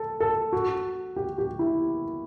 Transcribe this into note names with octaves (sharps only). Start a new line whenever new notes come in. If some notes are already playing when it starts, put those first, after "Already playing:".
Already playing: A4
A4
F#4
G4
G4
E4